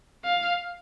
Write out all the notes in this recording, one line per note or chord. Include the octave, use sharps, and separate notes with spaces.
F5